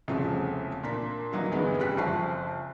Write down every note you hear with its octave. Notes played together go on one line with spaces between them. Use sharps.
E1 C2 C#3 F3 A3
A#2 D4 A#5 B6
D3 E3 F#3 A#3 D#4
D2 G2 D3 G#3 B3
F1 G3 C#4 F#6 B6
F#1 F3 C5 A5 C#6 C7